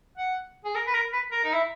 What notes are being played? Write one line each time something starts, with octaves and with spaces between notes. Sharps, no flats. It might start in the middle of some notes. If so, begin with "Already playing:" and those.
F#5
G#4
A#4
B4
A#4
B4
A#4
D#4
E4